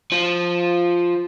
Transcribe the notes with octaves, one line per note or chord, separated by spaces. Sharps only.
F3